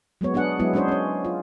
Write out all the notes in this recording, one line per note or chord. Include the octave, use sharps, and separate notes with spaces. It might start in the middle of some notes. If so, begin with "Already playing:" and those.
F#3 G#3 B3 C#5
B3 D4 G#4 F#5
F#3 G#3 B3 E4
G#3 C#4 D4 G#4 C5 C#5
C#4 C#5
F4